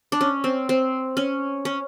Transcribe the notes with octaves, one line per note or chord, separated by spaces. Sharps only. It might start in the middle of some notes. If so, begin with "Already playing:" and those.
D4
C#4
C4
C4
C#4
C#4